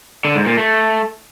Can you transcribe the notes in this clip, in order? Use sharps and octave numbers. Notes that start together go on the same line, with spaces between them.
D3
G#2
A#2
A3